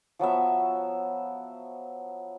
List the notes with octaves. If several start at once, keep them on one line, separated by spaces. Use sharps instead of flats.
F3 F#3 B3 E5